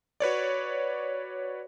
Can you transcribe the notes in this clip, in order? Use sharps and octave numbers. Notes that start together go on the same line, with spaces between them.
F#4 B4 C#5 D5